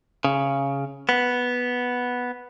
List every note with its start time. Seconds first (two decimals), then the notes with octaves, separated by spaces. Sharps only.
0.24 C#3
1.09 B3